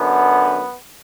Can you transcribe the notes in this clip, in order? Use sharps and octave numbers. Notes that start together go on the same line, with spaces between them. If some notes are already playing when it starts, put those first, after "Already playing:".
Already playing: F#2 D3 B3